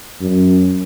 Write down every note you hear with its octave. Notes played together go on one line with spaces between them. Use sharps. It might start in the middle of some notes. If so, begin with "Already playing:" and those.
F#2